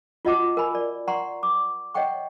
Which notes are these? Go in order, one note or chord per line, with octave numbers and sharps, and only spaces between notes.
F4 F#4 D#5 F#5 A5 D6
A#4 G#5 B5
D5
D5 F#5 A#5 C6 C#6
D6
C#5 D#5 F#5 G5 C#6